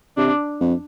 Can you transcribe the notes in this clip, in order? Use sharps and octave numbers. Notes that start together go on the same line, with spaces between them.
C3 D4
F2